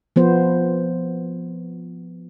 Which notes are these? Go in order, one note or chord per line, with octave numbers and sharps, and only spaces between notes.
F3 B3 C5